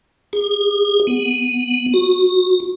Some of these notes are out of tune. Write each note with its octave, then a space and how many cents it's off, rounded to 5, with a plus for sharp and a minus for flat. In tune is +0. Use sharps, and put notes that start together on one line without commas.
G#4 -35
B3 -5
F#4 -20